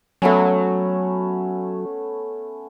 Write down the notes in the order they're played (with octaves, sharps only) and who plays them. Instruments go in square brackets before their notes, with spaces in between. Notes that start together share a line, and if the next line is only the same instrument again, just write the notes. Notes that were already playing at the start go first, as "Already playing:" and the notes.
[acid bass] F#3 [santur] A3 B3 C#4